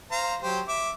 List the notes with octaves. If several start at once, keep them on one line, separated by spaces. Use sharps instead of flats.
C5 F5 A#5
F#3 G4 C5
E5 D6